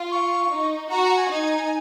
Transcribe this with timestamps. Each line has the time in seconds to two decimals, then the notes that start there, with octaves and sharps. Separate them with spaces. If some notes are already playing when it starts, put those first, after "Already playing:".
Already playing: F4
0.12 C#6
0.50 D#4
0.90 F#4 A#5
1.04 A#5
1.16 G#5
1.29 D#4